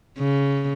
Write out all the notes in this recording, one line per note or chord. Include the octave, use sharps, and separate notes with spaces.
C#3